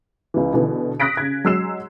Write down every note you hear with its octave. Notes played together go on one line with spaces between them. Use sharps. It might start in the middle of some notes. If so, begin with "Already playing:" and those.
C#2 E3
B2 D3 E3
D#6 F#6 A#6 B6 D7
C#3 G#6
F#3 G#3 E6 C7 E7